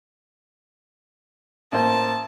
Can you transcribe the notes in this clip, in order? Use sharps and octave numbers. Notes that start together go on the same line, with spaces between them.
A1 A#3 C5 A5